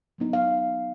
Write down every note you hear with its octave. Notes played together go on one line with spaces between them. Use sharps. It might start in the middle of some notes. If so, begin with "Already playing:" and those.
F#3 B3 D#4
F5